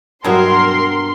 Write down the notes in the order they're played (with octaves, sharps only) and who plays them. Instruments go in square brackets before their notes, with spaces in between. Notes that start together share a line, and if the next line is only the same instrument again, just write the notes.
[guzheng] G2 B2 C4 [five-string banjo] F#3 F#4 [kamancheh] A#4 [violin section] C6